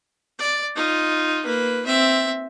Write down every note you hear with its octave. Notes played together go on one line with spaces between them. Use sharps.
D5
D#4 F4
A#3 B4
C4 E5